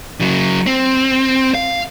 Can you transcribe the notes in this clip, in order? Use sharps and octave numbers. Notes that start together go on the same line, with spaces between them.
C#3 F#3
C4
F5